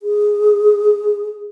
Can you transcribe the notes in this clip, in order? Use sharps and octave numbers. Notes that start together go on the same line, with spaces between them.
G#4